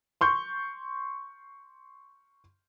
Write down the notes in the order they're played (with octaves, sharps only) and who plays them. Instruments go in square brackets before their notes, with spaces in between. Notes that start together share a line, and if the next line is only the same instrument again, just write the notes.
[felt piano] C6 C#6 G6